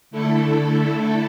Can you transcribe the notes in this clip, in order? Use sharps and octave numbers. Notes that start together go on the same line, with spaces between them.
D3 A3 E4 A4